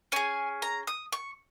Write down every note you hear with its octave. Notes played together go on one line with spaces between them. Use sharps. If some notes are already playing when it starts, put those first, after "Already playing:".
C#4 G#4 G#5
A#5
D#6
C#6